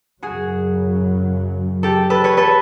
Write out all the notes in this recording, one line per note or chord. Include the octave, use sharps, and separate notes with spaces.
F#2 C#3 F#3 F#4 G#4
G4 A4
A4 B4
B4 C#5
A4 B4